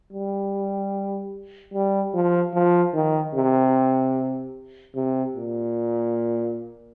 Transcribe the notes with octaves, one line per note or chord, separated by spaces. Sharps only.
G3
G3
F3
F3
D#3
C3
C3
A#2